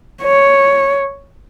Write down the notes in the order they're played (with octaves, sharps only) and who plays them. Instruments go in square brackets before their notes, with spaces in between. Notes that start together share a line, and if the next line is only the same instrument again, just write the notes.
[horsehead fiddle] C#5